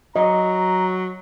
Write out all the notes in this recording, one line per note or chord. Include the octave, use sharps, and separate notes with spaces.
F#3 D#5 A#5